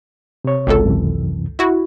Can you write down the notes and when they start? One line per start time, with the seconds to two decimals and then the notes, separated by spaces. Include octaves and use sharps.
0.44 C3 C#5
0.67 G#1 C#2 A4
0.86 F#2 C3 E3
1.59 E4 F#4